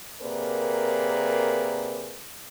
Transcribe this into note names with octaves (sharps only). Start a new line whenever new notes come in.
C3 A#3 G#4 A#4 B4 D5